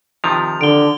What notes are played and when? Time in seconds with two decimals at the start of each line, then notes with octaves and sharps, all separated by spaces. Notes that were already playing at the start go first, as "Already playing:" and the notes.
0.24 C3 D#3 F3 F7
0.61 D3 D7 G7